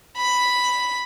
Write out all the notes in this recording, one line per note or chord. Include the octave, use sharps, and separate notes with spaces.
B5